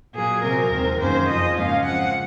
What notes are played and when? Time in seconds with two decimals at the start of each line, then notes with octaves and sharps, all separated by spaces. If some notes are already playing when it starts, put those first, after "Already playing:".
0.15 A#2 F#3 A#3 G#4
0.43 C3 F#3 C4 A#4
0.72 D#2 D#3 G#3 C4
1.00 F#2 D#3 A#3 C#4 C5
1.29 F2 C#3 F3 G#3 D#5
1.57 G#2 F#3 A#3 C#4 F5
1.86 C#3 F3 C4 F#5